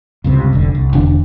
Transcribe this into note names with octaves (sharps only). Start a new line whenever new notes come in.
C#2 G2 C3
F1 A#1 D3
C2
E1 D3 D4